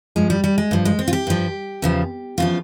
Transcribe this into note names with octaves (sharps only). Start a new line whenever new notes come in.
G2 F3 G#3
G3
G3
G#3
G2 F3
G#3
C4
F4
G4
G2 F3
E2 C#3 F3
E2 C#3 F3 F4